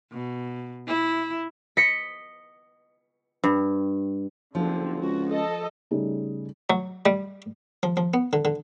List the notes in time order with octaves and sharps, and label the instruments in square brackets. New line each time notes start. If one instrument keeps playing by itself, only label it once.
[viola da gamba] B2
E4
[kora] D#5 [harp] B6 C#7
[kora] G2
[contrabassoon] F#1 [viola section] D3 C4 [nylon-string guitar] F3
[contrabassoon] C#2 [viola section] F#4
[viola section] A4 D#5
[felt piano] C#3 G3 A3 D#4 G#4
[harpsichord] F#3
G3
F3
F3
B3
D3
D3